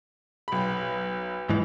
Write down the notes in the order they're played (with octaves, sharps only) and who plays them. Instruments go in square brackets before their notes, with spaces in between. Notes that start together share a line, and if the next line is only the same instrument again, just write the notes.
[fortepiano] B1 B5
[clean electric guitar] G#2 E3